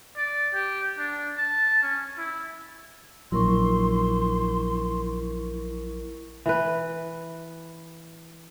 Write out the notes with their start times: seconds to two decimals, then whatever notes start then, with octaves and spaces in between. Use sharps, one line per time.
0.17 D5
0.53 G4
0.98 D4
1.37 A5
1.82 C#4
2.18 E4
3.32 A#1 F#3 E4 A#4 C6 C#6
6.46 E3 B4